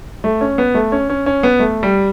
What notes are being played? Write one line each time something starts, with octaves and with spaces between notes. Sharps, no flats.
A3
C#4
B3
A3
C#4
C#4
C#4
B3
A3
G3